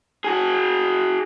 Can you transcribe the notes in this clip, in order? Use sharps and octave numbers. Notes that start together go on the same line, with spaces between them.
F#4 G#4